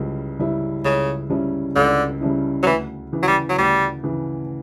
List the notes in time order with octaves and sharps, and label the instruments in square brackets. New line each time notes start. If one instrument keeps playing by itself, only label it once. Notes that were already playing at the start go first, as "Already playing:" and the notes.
Already playing: [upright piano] C#2 C#3 G3 C#4 E4
C#3 G3 C#4 E4
[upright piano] C#2 [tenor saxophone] C#3
[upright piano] C#3 G3 C#4 E4
[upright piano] C#2 [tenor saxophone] D3
[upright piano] C#3 G3 C#4 E4
[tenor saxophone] F#3
[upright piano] D2 [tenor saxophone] E3
[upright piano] C#3 E3
[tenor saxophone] F#3
G3
F#3
[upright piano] D2 [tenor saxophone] G3
[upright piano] C#3 E3